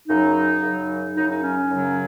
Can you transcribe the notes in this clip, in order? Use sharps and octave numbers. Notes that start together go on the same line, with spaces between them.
F#2 C#3 F#3 D#4
F#2 C#3 F#3
F#2 C#3 F#3 D#4
D#4
C#4
F#2 C#3 F#3